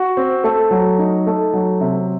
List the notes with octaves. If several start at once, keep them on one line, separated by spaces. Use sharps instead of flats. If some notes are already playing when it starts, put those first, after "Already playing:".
Already playing: F#4
C4
A3
F#3
D#4
A3
F#3
C3